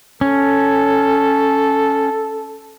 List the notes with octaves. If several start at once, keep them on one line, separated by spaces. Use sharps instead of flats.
C#4 A4